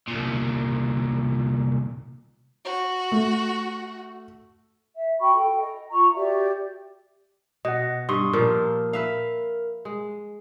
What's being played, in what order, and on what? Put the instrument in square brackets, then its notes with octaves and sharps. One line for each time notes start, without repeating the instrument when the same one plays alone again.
[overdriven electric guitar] C2 A#2
[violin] F#4
[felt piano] A3
[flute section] E5
F#4 G5 B5 C#6
A4 G5
D#5
F4 A#5 C#6
F#4 G4 D5 E5
[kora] B2 [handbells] D#5 F#5
[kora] G2 [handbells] C6 C#6 D#6
[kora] A#2 F3 F4 [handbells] A#4
[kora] B4 E5 F5
G#3